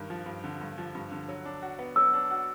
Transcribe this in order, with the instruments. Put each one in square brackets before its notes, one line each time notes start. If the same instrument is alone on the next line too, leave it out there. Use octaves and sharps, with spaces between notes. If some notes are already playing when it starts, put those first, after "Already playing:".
Already playing: [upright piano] G2 D#3
F3
G2
D3
G2
F3
G2
D3
F#3
D4
F#4
B3
[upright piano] F#3 [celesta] E6
[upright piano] D4
F#4